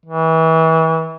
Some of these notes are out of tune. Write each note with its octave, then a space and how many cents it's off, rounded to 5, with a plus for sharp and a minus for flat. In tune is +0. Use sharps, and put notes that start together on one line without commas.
E3 -30